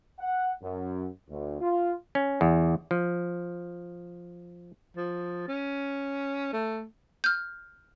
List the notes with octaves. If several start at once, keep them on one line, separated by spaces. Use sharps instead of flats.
F#5
F#2
D2
F4
C#4
E2
F3
F3
C#4
A3
F6 G6